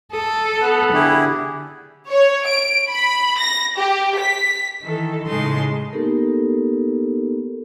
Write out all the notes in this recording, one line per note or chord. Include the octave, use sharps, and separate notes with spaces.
A4 D#6
B3
D3 E4 G4 G#4
C#5
D7
B5
A#6
G4
B6
D#3 E3 A4
A2 C#3 G#3 D#4 A5 C6
A#3 B3 D#4 G4 A4 A#4